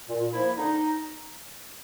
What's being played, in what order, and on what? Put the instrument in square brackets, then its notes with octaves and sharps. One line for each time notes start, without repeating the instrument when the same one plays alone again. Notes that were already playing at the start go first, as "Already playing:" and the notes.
[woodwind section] A#2
F3 A#3 E4
D3 D#4